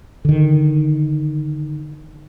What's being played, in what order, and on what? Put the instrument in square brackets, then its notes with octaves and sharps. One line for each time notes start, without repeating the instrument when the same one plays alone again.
[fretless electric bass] D3 D#3